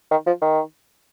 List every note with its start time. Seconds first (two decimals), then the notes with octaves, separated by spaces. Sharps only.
0.11 D#3
0.27 F3
0.42 D#3